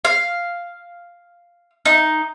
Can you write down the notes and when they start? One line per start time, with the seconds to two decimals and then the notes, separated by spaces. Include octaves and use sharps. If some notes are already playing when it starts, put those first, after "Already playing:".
0.05 F5
1.85 D#4